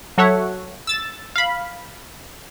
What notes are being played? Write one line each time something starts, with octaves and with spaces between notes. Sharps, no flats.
F#3 F#4 A4 C#5 E5 F#5
E6 A6
F5 B5